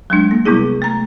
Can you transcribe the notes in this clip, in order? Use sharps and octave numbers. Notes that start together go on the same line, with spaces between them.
F#3 G#3 D4
A#3
C3 G3 B3 E4 G#4
A3 A#5